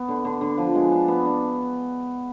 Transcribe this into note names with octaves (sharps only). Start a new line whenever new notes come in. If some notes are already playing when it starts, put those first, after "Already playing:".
Already playing: B3
D3
D3
D3
F3
G#3
D4
B3
D4